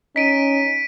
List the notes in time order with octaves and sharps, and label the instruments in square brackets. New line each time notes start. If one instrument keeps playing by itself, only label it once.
[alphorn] C#4 [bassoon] D#4 [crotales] B6 D7 D#7